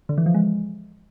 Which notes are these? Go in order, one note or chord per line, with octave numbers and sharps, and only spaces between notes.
D3
E3
F3
G#3